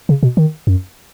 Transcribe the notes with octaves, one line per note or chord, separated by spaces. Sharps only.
C#3
B2
D#3
F#2